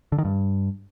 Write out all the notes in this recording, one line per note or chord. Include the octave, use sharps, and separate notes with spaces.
D3
D#3
G2